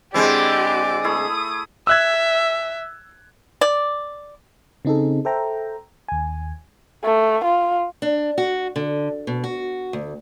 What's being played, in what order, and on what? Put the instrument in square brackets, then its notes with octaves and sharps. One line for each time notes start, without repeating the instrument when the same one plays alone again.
[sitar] D3 G#3 C4 [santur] E4 C5 [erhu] G4 [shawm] D5
[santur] A3 E4 G#4 [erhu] D#6
[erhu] E5 [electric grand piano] E6 F#6 G#6
[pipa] D5
[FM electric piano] C#3 C4 D#4 G#4 A4
A4 C5 E5 G5 A#5
D#2 G#5
[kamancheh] A3
F4
[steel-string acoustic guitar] D4
F#4
D3
B2
F#4
D2